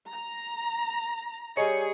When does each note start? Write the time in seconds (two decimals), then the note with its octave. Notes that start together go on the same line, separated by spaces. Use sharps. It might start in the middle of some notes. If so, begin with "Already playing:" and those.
0.11 A#5
1.57 G3 G#4 C#5 D#5 C#7